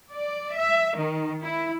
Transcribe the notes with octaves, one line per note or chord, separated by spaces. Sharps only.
D5
E5
D#3
E4